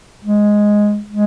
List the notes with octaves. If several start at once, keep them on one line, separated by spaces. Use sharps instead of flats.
G#3
G#3